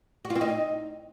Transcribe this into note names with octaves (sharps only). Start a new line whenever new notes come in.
F#4
F4
C4
D#4